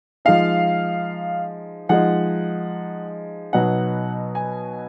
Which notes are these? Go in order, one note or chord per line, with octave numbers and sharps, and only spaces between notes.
F3 G#3 D#4 F5
F3 G#3 D#4 F#5
B2 F#3 B3 D#4 F#5
G#5